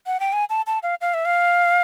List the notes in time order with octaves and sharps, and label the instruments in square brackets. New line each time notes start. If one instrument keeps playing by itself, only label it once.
[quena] F#5
G5
G#5
A5
A5
F5
F5
E5
F5